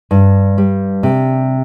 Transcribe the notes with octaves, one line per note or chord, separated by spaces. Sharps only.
G2
G3
C3